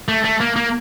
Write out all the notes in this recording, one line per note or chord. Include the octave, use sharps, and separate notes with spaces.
A3
A3
A#3
A#3